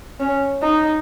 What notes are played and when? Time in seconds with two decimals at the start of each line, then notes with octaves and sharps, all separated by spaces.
0.20 C#4
0.62 D#4